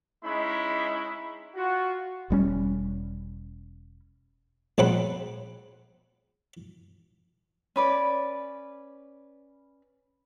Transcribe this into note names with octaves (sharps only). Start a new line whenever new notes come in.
G#3 C#4 D#4 E4 B5
F4 F#4
E1 G3 C#4
A#1 C#3 C4 F#5 B5
C#4 B4 D5